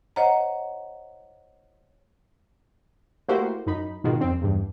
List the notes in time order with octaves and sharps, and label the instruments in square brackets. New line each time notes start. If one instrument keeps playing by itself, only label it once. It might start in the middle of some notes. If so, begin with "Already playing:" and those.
[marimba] C5 C#5 D#5 F#5 A#5
[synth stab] A3 A#3 E4 F#4 G4 C5
F#2 D#4 B5
G#2 B2 D#3 G#3 F4 F#4
F2 C4
E2 G2